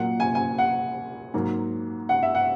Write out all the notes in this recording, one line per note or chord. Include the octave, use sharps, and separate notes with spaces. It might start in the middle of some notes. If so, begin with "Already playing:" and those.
Already playing: A#2 F#3 A#3 F#5
G#5
G#5
F#5
G#2 F#3 A#3
F#5
E5
F#5